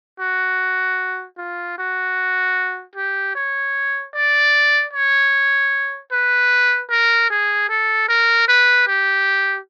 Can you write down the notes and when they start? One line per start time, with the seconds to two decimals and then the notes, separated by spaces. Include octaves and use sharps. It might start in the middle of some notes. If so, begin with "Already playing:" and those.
0.20 F#4
1.38 F4
1.78 F#4
2.96 G4
3.35 C#5
4.14 D5
4.93 C#5
6.12 B4
6.91 A#4
7.30 G#4
7.69 A4
8.09 A#4
8.48 B4
8.87 G4